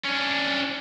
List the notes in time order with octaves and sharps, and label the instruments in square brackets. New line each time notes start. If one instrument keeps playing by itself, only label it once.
[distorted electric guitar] C#4 D4